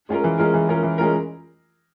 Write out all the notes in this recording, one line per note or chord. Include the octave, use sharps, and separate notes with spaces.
G#3 C#4 F4 A#4
E3
G#3 C#4 F4 A#4
E3
G#3 C#4 F4 A#4
E3
G#3 C#4 F4 A#4